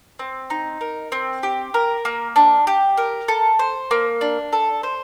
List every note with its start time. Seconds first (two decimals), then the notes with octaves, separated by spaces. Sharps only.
0.19 C4
0.50 D#4
0.81 A#4
1.12 C4
1.43 G4
1.74 A#4
2.05 A#3
2.36 D4
2.67 G4
2.97 A#4
3.28 A4
3.59 C5
3.91 A#3
4.21 D4
4.53 A4
4.83 C5